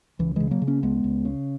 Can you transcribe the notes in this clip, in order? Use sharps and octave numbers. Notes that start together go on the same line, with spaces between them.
C#2 E3
C#3 E3 G#3
F#3 A#3
C#3
A#3 C#4
C#2 G#3 B3
C#2
C#3